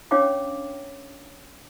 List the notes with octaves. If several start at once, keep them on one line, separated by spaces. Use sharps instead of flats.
C#4 D4 C#5 F5 G5 D6